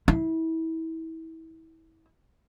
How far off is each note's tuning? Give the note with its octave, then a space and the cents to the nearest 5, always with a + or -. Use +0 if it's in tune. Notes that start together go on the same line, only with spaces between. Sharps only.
E4 -30